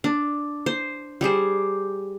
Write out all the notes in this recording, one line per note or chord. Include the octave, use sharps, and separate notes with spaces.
D4
C5
G3 G4 G#4 C5